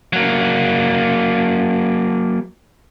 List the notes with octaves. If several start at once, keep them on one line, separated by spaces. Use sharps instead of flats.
F#3 A#3